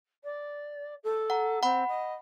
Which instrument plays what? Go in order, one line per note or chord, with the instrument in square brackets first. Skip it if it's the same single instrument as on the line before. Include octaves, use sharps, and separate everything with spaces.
[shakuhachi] D5
A4
[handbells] F#5 A#5
[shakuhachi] C4 [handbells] F#5 B5
[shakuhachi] D#5